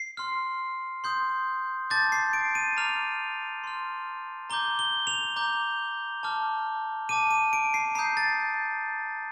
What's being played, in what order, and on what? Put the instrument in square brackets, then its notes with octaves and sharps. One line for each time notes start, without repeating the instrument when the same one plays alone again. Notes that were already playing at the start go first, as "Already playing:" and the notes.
Already playing: [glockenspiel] C7
C6 F6
C6 D#6 G6
A5 D6 G6 A6
C7
D7
D#7
A#5 D6 F6 F7
C6 F6
A#5 D6 G6 G7
G7
F7
A#5 D6 G6
A5 D6 F6
A5 D6 F6 D#7
D#7
D7
C7
A#5 D#6 G6 C7
A6